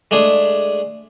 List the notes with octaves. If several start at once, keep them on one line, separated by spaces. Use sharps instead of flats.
G#3 A3 D4 G#4